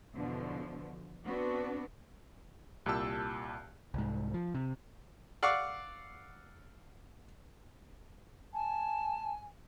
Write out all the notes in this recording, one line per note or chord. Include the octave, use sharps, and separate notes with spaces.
E2 B2 D3 F3
B3 C4 D4 F#4 B4
C2 A#2 G4 A5 E6
C2 G#2
F3
C3
D5 F5 F#5 C#6 D6 E6
G#5 A5